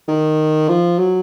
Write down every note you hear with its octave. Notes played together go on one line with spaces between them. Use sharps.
D#3
F3
F#3